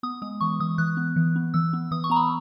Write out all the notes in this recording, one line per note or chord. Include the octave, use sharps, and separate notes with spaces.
B3 D#6
G#3 D#6
E3 C#6
E3 D#6
E3 F#6
B3
E3
B3
E3 E6
B3
E3 D#6
C#6
B3 A#5
B5